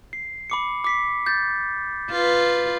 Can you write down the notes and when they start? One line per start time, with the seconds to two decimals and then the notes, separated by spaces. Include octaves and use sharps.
0.13 C7
0.50 B5 D6 C#7
0.84 D6 B6 C7
1.26 G6 A6
2.11 F4 B4